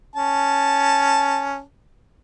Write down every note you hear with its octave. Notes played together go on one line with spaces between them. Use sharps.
C#4 A5